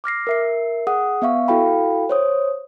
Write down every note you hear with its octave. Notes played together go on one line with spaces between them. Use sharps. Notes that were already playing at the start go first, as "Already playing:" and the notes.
D6 F6 A#6 C7
A#4 E5 C7
G#4 F#5 D#6
B3 E5 F5 C#6
E4 F#4 A4 F5 G5 B5
C5 C#5 D#6